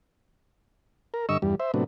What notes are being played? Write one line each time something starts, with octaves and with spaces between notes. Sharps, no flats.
A#4
G2 D3 D#5 C#6 E6
E2 G2 G3
C5 E5
A2 C3 F#3 B3 D4